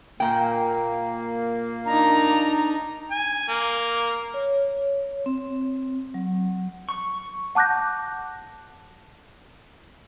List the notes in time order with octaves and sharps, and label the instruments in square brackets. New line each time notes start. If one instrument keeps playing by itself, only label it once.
[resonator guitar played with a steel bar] A#2 G5 [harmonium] A#3
[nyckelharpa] D4 D#4 [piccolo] A#5
[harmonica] G#5
A#3
[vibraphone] C#5
C4
F#3
[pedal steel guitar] C#6
[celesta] F#5 A5 D6 F#6 G6 A#6